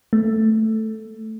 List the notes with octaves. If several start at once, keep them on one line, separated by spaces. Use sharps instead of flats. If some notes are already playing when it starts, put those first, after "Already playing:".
A3